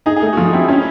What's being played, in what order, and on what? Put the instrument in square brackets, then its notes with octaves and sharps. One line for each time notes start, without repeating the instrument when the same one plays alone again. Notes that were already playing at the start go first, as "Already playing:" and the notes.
[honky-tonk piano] D#4 [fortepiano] G#4
[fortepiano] G#4
[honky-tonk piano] A3
[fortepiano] F#4
[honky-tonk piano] F3 [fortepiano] F4
[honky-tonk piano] C4 [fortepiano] E4
[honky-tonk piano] C#4 [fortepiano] E4